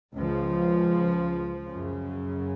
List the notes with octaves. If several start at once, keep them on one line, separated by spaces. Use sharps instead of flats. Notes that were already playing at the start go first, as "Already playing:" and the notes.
C#2 C#3 F3
F#2 C#3